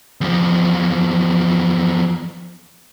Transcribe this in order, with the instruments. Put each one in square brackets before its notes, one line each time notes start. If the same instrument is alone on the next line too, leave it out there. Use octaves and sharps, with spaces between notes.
[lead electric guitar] E2 F3